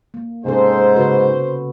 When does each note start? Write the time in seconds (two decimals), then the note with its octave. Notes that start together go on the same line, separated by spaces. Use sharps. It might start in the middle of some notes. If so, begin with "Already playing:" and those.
0.14 A#3
0.45 G#2 C3 C#4 A4 C5
0.96 C#3 F#4 B4